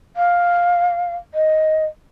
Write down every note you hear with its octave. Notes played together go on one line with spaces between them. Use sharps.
F5
D#5